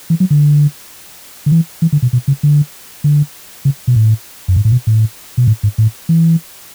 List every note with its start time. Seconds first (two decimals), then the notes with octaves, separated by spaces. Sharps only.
0.10 E3
0.20 F#3
0.30 D3
1.46 D3
1.52 E3
1.82 E3
1.92 D3
2.02 B2
2.13 B2
2.28 C#3
2.43 D3
3.04 D3
3.65 C#3
3.87 B2
3.95 A2
4.48 F#2
4.56 G#2
4.65 A2
4.72 B2
4.87 A2
5.37 B2
5.47 A2
5.63 G#2
5.78 A2
6.09 E3